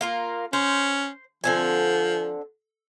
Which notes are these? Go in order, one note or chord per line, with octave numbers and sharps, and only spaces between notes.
A#3 F4 A#4
C#4 C5
D3 F3 C4 G#5